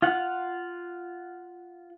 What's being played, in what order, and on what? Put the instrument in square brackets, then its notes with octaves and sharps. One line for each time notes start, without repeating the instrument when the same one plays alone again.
[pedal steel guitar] F4 F5 F#5